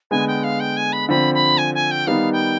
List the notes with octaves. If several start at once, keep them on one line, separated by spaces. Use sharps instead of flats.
D3 G#3 B3 G#5
G5
F5
G5
G#5
B5
D3 F3 C4 B5
B5
G#5
G#5
G5
D#3 G3 B3 D#4 F5
G5